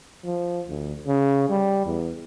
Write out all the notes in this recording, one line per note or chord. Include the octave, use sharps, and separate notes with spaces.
F3
D2
C#3
G3
E2